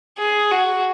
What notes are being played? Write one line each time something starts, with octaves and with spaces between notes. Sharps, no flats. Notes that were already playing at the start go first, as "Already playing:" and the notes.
G#4
F#4